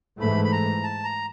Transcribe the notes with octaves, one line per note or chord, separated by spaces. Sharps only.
G#2 E3 A3 B5
B5
A#5
A5
A#5